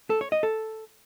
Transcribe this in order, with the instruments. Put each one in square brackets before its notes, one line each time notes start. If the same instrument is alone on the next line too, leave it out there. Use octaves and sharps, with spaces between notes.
[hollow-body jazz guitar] A4
C#5
D#5
A4